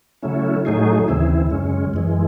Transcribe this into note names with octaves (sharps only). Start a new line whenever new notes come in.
C#3 F#3 A3 C#4 E4
A2 F#3 A3 D#4 G#4
D#2 C#3 E3 C4 E4
F#2 C#3 G#3 C#4
F#2 E3 G#3